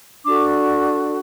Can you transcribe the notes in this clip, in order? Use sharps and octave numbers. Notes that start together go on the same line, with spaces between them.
D4 F#4 A4 D6